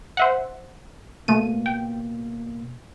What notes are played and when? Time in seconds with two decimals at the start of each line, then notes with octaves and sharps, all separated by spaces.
0.17 C5 E5 F#5
1.28 B2 A3 A#3 D#7
1.66 G5